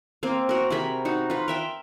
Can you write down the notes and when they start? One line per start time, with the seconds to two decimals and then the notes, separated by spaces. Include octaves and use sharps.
0.23 A#3 C4
0.49 F#4 A#4
0.70 C3 G#4 A#4 B5
1.05 D#4 F#4
1.30 F4 B4
1.48 A#4 E5 G5